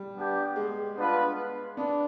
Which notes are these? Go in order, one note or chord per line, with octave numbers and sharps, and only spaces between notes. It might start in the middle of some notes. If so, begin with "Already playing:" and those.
Already playing: G3
B3 D4 G4
G#3
B3 D4 F4 B4
B3 D4